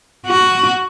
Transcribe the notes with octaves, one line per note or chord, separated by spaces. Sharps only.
F#4